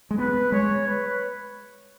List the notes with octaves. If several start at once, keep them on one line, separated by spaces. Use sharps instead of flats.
G#3
B3 B4
G#3 C#5
B4